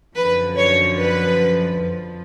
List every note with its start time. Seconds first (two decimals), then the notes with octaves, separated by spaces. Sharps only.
0.15 F#2 D3 F3 B4
0.57 C#5
0.98 B4
1.81 F2 F3